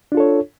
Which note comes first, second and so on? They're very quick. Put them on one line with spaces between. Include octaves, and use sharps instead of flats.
D4 F4 A4 C#5